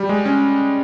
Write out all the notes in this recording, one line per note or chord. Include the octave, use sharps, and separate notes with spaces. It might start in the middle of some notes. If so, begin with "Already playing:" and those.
Already playing: G3
G#3
C#4